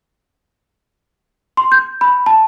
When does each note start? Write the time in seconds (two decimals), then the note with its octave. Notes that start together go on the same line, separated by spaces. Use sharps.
1.57 C6
1.72 G6
2.01 B5
2.26 A5